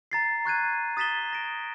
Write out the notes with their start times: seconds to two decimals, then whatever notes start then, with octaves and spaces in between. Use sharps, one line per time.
0.12 A#5 A6 C7
0.45 C#6 F#6 G#6 D#7
0.97 D#6 A6 B6 E7 G7
1.33 A#6 D7